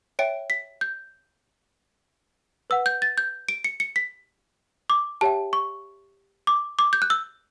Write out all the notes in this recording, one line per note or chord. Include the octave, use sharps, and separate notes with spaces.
C#5 E5 G5 D7
B6
G6
B4 F#5 E6
G6
A6
G6
D7
C#7
C#7
B6
D6
G4 C#5 E5 G5 A5
C#6
D6
D6
G6
F#6
E6